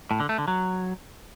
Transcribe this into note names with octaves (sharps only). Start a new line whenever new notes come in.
A2
D3
A3
D3
F#3